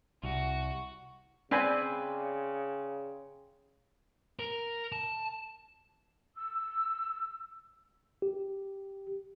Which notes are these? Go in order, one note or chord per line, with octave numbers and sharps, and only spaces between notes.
C2 F#4
C#3 C4 B4 D5 G5 G#5 C6
A#4
A5
E6
G4